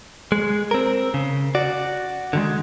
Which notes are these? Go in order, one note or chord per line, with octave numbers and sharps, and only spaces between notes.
G#3
C4 A#4
C#3
F#4 D5
D3 D#3 G#3